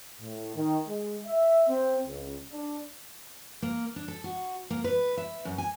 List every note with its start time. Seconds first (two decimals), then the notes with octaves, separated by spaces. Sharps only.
0.20 A2
0.56 D#3
0.87 G#3
1.26 E5
1.68 C4
2.07 C#2
2.53 D4
3.62 A#3
3.96 D4
4.08 A4
4.24 F#4
4.71 A#3
4.84 B4
5.17 E5
5.45 F#2
5.58 G#5